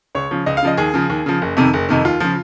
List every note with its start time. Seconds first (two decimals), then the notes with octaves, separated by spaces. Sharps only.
0.15 C#2 C#5
0.31 C#3 F3
0.46 C#2 D#5
0.57 F5
0.63 C#3 F3 D#5
0.77 D#2 G#4
0.94 C#3 F3
1.10 D#2
1.26 C#3 F3
1.42 F#1
1.57 F2 C3 D#3
1.74 F#1
1.89 F2 C3 D#3 D#4
2.05 D#2 F4
2.20 C#3 F3